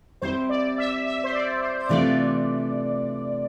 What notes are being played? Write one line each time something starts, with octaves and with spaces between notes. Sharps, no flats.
G3 C4 E4 G4 C5
D5
E5
E5
C5
D5
C5
C3 E3 A3 D4 F4 D5